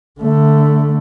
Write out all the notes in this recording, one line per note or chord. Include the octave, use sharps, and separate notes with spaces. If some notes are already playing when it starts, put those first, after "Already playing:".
D3 A3